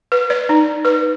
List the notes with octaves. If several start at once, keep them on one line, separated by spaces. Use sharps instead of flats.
B4
D5
D#4
B4